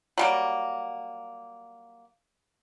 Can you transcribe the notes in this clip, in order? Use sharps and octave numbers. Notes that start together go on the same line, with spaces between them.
F#3 G3 A#3